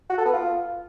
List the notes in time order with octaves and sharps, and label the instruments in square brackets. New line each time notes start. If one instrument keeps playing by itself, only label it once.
[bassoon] F#4
A4
B3
F4